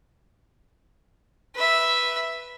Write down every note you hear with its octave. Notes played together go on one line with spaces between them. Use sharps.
B4 E5